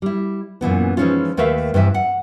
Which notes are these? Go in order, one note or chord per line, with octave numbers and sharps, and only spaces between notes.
G3 E4
F#2 A#2 E3 B3
E3 F3 G#3 C#4 D#4 F4
D#2 A3 A#4 B4 E5 F5
G2 C3 E3 E5
F#5